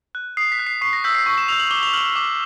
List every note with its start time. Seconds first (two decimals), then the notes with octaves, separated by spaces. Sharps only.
0.15 F#6
0.37 D#6 C7
0.52 B6
0.59 F#6
0.67 C7
0.81 C#6 C7
0.93 A#6
1.04 E6 G6 B6
1.15 C7
1.26 C#6
1.38 E7
1.48 E6 G6 F7
1.60 F#7
1.71 D6 G7
1.83 F7
1.94 F6 F#7
2.16 D6